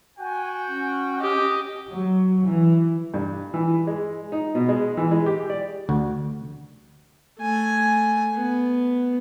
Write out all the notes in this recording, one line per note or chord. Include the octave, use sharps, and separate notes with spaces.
F#4 G5 G#5
C#4
G4 D#5
F#3
E3
G2
E3
G#3
D#4
B2
G#3
E3
G#3
G4
D5
D2 F#4
A3 G#5
B3